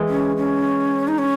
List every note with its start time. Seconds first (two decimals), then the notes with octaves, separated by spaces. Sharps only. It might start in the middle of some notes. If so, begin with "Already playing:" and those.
Already playing: E3 G#3
0.09 C#4
0.37 C#4
1.08 D#4
1.18 C#4